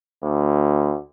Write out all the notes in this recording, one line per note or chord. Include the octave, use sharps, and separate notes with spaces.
D2